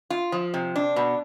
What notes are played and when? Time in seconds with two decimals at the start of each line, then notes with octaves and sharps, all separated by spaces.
0.10 F4
0.32 F3
0.54 C3
0.76 D4
0.96 B2